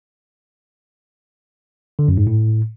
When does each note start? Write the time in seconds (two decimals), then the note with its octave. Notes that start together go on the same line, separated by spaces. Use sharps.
1.99 D3
2.08 F#2
2.17 G#2
2.27 A2